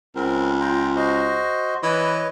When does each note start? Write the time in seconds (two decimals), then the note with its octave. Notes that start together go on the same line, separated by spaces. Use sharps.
0.16 C#2 C4 A#4
0.60 F4 G5 A#5
0.96 F#4 C5 D#5
1.83 E3 B4 C#5 D#5